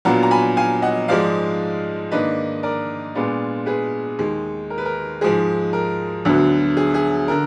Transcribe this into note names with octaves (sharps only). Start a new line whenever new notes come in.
A#2 F#3 B3 D4 F4 F#5 A#5
A#5
G#5 B5
F5 G#5
D#5 F#5
G#2 F3 G#3 D#4 D5 F5
G#2 D#3 A#3 D4 B4 D#5
A#4 D5
A#2 G#3 B3 D4 F4
G#4 B4
D#2 D#3 G#3
A#4
B4
A#4
G#2 F3 G#3 G#4
A#4
D2 D3 F#3 B3
G#4
G#4
D3 A#4